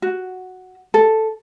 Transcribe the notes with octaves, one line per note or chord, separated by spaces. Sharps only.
F#4
A4